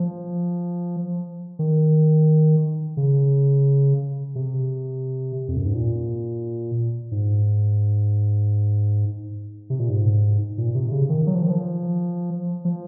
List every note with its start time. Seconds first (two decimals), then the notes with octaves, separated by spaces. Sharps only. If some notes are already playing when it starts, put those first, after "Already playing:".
Already playing: F3
1.59 D#3
2.97 C#3
4.35 C3
5.48 F2
5.57 F#2
5.66 G#2
5.74 A#2
7.11 G#2
9.70 C3
9.79 A#2
9.89 G#2
10.58 A#2
10.75 C3
10.92 C#3
11.09 D#3
11.27 F#3
11.35 F3
11.43 D#3
11.50 F3
12.65 F3